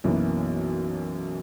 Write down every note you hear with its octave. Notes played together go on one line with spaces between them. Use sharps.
B1 F#2 E3 A#3 B3